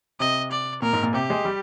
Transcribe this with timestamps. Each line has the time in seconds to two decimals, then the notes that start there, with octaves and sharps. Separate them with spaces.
0.20 C3 D#5
0.52 D5
0.82 A#2 A#4
0.93 G#2
1.03 A#2
1.14 C3 G4
1.30 G#3
1.45 G3